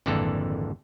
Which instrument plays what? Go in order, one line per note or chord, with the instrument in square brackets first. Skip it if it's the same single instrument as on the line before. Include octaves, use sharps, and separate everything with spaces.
[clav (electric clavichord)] G#1 F2 A#2 D3 E3 A4